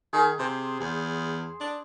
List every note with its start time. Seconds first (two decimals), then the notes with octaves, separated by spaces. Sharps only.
0.13 D#3 G#4
0.39 C3 C5
0.80 E2
1.61 D4